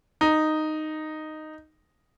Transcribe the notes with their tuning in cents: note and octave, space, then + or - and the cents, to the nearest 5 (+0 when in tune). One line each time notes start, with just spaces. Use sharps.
D#4 -5